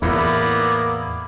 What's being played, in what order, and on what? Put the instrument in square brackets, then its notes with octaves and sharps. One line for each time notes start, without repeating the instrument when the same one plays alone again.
[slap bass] E2 A2 [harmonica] A#3 B3 D5 [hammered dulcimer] E4